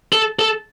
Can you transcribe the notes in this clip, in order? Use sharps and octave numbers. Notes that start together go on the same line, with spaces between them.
A4
A4